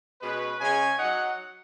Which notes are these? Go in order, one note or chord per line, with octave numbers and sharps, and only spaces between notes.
B2 G#3 C#4 B4
C#3 G#3 C#4 G#5
F#3 D#4 F#5